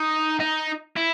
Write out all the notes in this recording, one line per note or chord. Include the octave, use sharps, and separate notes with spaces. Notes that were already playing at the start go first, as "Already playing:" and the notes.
Already playing: D#4
D#4
E4